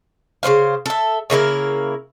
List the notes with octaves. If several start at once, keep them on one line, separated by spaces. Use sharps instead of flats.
C#3 B3 C5 F5
A4 E5
C#3 A#3 E4 A#4